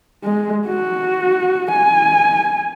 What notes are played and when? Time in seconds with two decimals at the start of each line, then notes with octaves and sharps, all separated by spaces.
0.24 G#3
0.67 F#4
1.71 G#5